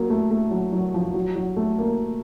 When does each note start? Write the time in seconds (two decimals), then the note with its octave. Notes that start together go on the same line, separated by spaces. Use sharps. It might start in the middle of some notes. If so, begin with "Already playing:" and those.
Already playing: F#3 A#3
0.10 A3
0.31 A3
0.51 F#3
0.73 F#3
0.94 F3
1.14 F#3
1.36 F#3
1.56 A3
1.78 A#3